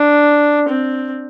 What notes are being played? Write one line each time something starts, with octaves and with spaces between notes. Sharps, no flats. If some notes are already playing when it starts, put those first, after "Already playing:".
Already playing: D4
C4